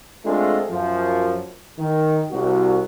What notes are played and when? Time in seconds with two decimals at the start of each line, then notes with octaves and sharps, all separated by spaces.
0.25 G#3 A3 C4 D4 F4 A4
0.71 F#2 F3
1.78 D#3
2.31 C2 F#4